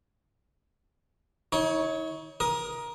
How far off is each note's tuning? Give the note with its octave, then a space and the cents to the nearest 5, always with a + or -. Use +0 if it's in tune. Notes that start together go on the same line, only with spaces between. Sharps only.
D#4 +45 C#5 +0
A#4 +20 D#6 +0